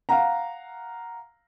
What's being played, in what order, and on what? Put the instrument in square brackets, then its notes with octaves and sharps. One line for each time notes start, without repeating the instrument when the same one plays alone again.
[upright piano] F5 F#5 A#5